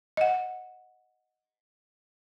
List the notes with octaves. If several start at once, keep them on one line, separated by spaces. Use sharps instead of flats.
D#5 F#5